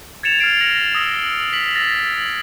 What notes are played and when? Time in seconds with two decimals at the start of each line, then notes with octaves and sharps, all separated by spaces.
0.23 G#6 A6 C#7 E7 F7
0.39 F6 G#6 C7 D7 F7
0.60 F6 A6 A#6 C7 C#7 F#7
0.95 D#6 E6 A#6 G7
1.53 B6 F#7
1.75 E6 A6 A#6